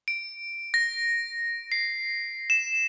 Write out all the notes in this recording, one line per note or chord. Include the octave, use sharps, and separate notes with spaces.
D7
A#6
C7
E7